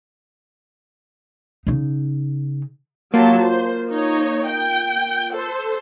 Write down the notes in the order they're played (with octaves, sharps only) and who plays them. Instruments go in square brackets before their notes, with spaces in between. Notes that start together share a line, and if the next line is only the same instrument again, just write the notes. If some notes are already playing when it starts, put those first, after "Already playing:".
[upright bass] C#3 D#4
[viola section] F#3 G4 A5 [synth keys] A#3 F4
[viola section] C5
D#4 C#5
G5
A4 C5